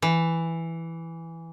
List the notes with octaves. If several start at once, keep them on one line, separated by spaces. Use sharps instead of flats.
E3